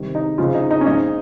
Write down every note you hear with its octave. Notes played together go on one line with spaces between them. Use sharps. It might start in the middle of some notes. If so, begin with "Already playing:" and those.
Already playing: C3 D#3 G3
D#4
C#3 F3 G#3 F4
D#4
D#4
C#4
A#2 F3 G#3 D#4